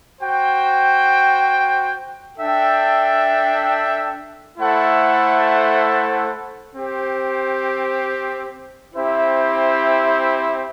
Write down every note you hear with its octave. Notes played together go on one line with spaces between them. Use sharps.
F#4 C5 G5
D4 A4 E5 G5
A3 E4 A4 C5 F#5
C4 G4 C5
C4 E4 G4 C5 E5